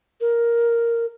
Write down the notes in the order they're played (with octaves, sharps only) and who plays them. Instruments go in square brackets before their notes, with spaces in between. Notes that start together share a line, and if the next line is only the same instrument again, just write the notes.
[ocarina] A#4